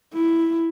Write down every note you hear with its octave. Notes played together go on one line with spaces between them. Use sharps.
E4